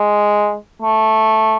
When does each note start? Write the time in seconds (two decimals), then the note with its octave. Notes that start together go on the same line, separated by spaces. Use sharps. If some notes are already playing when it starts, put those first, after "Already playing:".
Already playing: G#3
0.82 A3